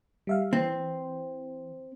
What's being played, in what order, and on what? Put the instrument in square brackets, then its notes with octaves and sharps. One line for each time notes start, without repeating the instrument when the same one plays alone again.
[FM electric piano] G3 E5 F5
[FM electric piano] E3 [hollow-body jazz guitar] C4